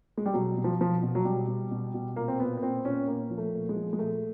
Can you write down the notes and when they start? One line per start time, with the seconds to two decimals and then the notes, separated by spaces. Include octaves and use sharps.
0.17 G#3
0.26 G3
0.34 B2 F#3
0.57 B2
0.64 F3
0.80 B2 F3
1.03 B2
1.15 F#3
1.25 B2 G3
1.47 B2
1.71 B2
1.94 B2
2.16 A#2 A#3
2.28 C4
2.40 A#2 B3
2.57 B3
2.63 A#2 C4
2.85 A#2 C#4
3.07 A#2 A#3
3.31 F3
3.38 A3
3.53 A#2
3.69 G#3
3.76 F3
3.93 G#3
3.99 A#2 A3